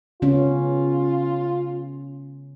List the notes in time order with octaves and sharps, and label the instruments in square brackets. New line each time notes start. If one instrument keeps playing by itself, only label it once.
[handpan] C#3 B3 C#4 [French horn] F4